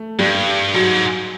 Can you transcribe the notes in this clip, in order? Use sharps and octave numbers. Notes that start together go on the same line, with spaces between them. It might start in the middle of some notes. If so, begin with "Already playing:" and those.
Already playing: A3
G2 G3
G#2 F#3